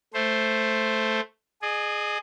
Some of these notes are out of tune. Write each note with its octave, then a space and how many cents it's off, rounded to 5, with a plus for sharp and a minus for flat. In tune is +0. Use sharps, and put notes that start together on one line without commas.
A3 +0 C5 +0
G#4 +5 D#5 -40